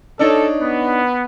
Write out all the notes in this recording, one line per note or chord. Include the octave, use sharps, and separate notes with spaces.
D4 D#4 A4 C#5
B3